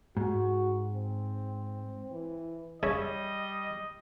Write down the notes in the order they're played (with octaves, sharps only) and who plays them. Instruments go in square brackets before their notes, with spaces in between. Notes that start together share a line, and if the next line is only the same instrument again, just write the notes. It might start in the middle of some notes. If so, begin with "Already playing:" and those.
[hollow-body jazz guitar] G#2 [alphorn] F#4
[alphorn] C4
E3
[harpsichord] C#3 C#5 E5 [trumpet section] G3 D#5